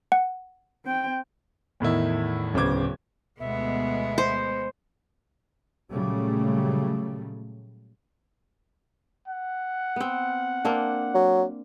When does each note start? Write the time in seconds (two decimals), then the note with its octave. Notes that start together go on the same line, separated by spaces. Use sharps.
0.12 F#5
0.85 C4 G5
1.80 E2 A2 D#3 E4
2.54 D1 C#3 B3 C5 D6 G#6
3.40 D2 B2 G#3 B3 E5
4.18 C5
5.92 A#2 C#3 F#3 G3 A3
9.28 F#5
9.96 B3 C4
10.65 A#3 C4 D4
11.14 F#3